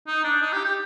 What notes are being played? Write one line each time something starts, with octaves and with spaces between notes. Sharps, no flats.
D#4
D4
D#4
G4
G4